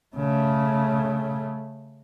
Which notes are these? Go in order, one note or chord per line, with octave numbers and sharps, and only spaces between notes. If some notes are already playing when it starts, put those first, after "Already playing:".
C#3 A3